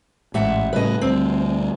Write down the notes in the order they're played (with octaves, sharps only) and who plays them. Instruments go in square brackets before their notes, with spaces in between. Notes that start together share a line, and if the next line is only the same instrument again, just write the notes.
[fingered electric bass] A1 [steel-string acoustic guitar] G#2 E5 F#5
[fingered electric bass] A2 C#3 G3 [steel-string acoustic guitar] B4 D#5
[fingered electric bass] D2 G3 [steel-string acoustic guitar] C4